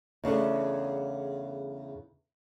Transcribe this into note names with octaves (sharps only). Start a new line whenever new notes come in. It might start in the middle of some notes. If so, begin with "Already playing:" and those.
E2 C#3 A3 D4